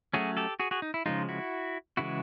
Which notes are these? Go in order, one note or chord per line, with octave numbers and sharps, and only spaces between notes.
F#3 A3 C#4 F#4 G#4
G4 A4
F#4 G#4
F#4 G#4
D#4
E4
C#3 F3 G#3 D#4 F4
E4 F#4
C#3 E3 G#3 E4 F#4